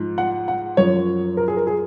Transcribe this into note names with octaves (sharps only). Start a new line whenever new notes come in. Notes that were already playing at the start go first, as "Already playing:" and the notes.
Already playing: G#2 F3
F#5
F#5
F#2 F3 C#5
A#4
G#4
A#4
G#4